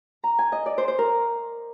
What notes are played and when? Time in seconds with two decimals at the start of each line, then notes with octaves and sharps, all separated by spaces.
0.24 A#5
0.39 G#5
0.52 D#5
0.66 D5
0.78 C5
0.88 C5
0.98 A#4